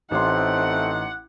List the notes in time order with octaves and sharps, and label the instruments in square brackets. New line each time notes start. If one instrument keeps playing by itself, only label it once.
[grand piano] A1 C6 [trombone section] A3 C4 [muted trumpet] D#4 [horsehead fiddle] F#5